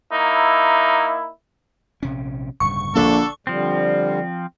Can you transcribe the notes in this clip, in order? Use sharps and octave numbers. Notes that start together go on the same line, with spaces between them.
A#3 D#4 E4
A#1 C3 C#4
D1 G2 C#3 C#6
A#1 D3 D4 A4
D3 F3 G3 C4